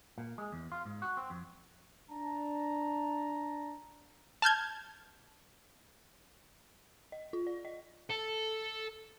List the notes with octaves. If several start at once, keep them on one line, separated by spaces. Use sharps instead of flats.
A#2
G#3
E2
F4
G#2
F#4
C4
F2
D4 A5 A#5
A5 F6 G6 G#6
D#5
F4
D5
D#5
A4